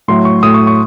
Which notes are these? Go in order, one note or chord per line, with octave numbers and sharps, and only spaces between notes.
A2 F#3 A3 C6
C#6
A2 F#3 A3 D#6
C#6
C#6